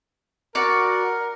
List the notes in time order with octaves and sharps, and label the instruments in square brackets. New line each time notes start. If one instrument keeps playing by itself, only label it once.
[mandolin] F#4 D5 [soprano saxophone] A#4